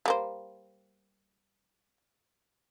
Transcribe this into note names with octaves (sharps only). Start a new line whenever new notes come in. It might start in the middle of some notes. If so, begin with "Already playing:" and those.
G3 A#3 C5